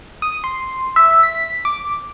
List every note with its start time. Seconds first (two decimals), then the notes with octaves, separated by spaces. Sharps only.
0.22 D#6
0.44 C6
0.96 E5
1.23 B6
1.65 D6